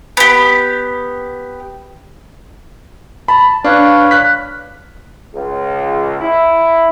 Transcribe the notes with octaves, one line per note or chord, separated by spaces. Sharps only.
B3 G4
A5 B5
D4 B4 C#5 F5
F#6 B6
C#2
E4